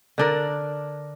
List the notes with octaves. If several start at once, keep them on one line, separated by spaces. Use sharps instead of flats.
D3 D4 A#4